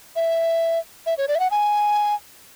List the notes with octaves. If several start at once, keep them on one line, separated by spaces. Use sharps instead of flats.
E5
E5
C#5
D5
E5
F#5
G#5